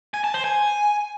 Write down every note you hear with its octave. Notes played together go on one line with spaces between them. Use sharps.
G#5
A5
C5
G#5